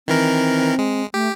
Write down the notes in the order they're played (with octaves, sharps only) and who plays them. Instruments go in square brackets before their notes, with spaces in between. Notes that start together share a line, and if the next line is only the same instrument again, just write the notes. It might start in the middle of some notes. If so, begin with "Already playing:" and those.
[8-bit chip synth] D#3 E3 A#4 [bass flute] C4
[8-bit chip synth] G#3
[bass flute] A3 [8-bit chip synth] G4